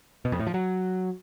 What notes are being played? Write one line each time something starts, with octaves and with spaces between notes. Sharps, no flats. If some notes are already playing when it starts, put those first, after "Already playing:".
B2
F2
A2
F3
F#3